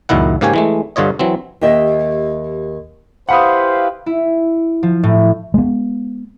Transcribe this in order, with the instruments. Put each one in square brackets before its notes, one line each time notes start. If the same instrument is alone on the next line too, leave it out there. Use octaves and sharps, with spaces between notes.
[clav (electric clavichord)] C#2 F#2 A#2 D#3 E4 F#5
G#2 C#3 A#3 G4 C#5 G#5
E3 G#3 A3
G2 D3 F4 C#5 D#5
E3 F#3 C4
[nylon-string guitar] D#2 G4 D#5 E5
[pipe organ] E4 G4 B4 [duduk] C5 [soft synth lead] F5 [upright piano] F#5 B5 D#6
[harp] E4
F3
A2
[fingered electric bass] G#3 B3